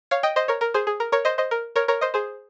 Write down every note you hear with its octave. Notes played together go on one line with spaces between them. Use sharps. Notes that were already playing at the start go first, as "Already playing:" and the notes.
C#5 F5
D#5 G5
C5 D#5
A#4 C#5
A#4
G#4 C5
G#4
A#4
A#4 C#5
C5 D#5
C5 D#5
A#4
A#4 C#5
A#4 C#5
C5 D#5
G#4 C5